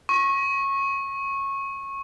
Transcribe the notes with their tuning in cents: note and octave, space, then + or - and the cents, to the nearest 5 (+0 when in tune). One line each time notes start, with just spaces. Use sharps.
C#6 -20